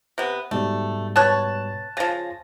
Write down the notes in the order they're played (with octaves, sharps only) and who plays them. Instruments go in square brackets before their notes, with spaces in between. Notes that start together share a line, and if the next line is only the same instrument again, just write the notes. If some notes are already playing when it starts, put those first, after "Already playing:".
[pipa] C3 B3
[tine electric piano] G#2 B2 G3 [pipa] A3
[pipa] B3 C#5 [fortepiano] A5 F#6
[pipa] C#3 F3 [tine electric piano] G#5 A6 A#6